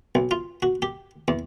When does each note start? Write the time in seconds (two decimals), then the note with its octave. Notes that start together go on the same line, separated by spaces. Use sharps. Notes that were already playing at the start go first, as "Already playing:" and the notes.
0.15 B1
0.31 F4
0.62 F#4
0.82 G4
1.28 E2